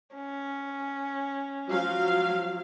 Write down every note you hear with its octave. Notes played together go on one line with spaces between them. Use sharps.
C#4
F3 F#3 F5